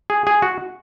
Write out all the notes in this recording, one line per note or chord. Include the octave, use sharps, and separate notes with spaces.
G#4
G#4
F#4